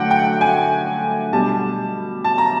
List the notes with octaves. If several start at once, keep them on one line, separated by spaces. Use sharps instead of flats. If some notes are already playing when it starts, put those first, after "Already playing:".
Already playing: D3 F#3 A3 F#5 G5
G5
G#5
B2 G3 A5
A5
A#5